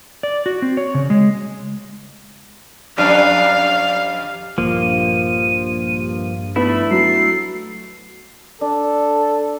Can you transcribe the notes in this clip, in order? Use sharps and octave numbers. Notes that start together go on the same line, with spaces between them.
D5
F#4
C4
C#5
C#3
G#3
F2 G3 D4 F5
A#1 G2 F3 A#3 D#7
A3 B3 D4 E4 B5
F#3 C7
D4 A4